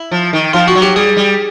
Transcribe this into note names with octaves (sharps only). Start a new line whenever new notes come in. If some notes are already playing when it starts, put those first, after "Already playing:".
Already playing: E4
F3
D#3
F3 F4
F#4
F#3
G4
G3 G#4
G3